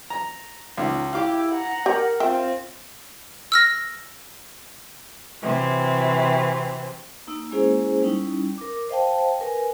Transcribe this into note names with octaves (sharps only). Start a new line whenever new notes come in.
A#5
C#2 D#4
E4 G4 F5 D6
F#5 A#5
G4 A#4
C4 F4 E5 G5
E6 F6 A#6
C3 E3 F#3 C4
A#3 D#4 E6
G#3 A#3 C#4 E4 G#4 C5
G3 C#4 D#4 E4
A#4 D6
C5 D#5 F5 G5 A5
A#4 B4 G#5